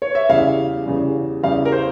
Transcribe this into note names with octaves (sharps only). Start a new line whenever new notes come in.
C#5
E5
E2 C#3 G3 F5
E2 C#3 G3
E2 C#3 G3 F5
A#4
C5